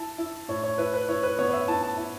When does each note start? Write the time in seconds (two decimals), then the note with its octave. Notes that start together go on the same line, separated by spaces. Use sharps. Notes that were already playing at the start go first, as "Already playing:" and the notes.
Already playing: E4 A5
0.18 E4
0.48 A2 C#5
0.63 C#5
0.78 E4 B4
0.93 B4
1.09 E4 C#5
1.23 B4
1.39 B3 C#5
1.49 C#5
1.53 E5
1.68 E4 A5
1.83 A5
1.97 E4